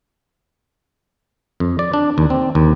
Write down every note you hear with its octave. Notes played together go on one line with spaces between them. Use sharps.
F2
D5
D4
D#2
C4
D#2